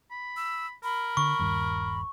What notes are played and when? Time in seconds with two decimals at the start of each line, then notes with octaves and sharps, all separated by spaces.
0.11 B5
0.37 E6
0.84 A#4 B5
1.17 D3 C#6
1.39 D#1 G2 D#3